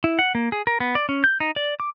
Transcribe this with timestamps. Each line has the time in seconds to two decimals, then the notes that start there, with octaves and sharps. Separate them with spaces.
0.04 E4
0.19 F#5
0.35 A#3
0.52 G#4
0.67 A#4
0.80 B3
0.95 D5
1.09 C#4
1.24 G6
1.40 D#4
1.56 D5
1.80 D6